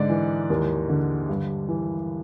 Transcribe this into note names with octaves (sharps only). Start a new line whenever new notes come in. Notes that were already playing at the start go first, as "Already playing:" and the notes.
Already playing: G#2 D3 D5
E3
D#2
D3
G2
E3